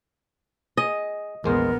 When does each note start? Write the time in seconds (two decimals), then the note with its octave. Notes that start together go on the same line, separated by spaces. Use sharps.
0.77 G#4 D#5
1.44 A#1 E2 G#3 B3 A#4 C5